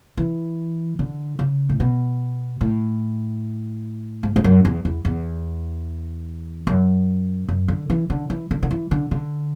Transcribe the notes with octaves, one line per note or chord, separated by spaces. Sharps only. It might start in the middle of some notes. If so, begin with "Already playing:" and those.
E3
D3
C#3
A2
B2
A2
G#2
G#2
F#2
E2
E2
E2
F#2
F#2
D3
E3
D3
E3
D3
D3
E3
D3
D3